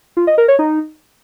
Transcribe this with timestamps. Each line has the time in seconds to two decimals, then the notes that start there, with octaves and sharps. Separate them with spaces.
0.17 F4
0.27 D#5
0.38 A#4
0.48 C#5
0.59 D#4